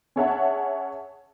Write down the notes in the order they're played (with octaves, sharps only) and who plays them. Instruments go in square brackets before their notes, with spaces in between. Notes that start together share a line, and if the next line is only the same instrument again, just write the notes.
[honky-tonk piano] C#4 G#4 C#5 E5 F#5 A5